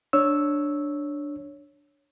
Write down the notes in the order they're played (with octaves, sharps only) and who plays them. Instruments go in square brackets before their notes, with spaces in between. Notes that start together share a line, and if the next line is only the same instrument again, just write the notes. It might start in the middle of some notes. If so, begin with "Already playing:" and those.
[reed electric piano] D4 C#5 E6